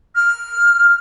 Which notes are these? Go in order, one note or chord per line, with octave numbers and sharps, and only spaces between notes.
F6